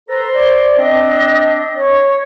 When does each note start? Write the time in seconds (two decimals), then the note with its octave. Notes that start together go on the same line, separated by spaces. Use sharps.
0.08 A4 B4 C5 A#5
0.35 D5
0.76 C4 D4 D#5
1.75 C#5